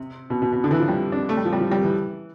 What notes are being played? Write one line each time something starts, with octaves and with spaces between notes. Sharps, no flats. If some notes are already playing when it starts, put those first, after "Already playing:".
Already playing: C3
B2
B2
B2
D3
E3
F3
G3
D4
A3
G3
F3
G3
F3
G3
E3